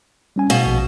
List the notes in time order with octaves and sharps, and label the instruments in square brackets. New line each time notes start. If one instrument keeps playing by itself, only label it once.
[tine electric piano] G3 C#4 G#5
[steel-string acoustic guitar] B2 [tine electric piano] F5
[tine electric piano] A#1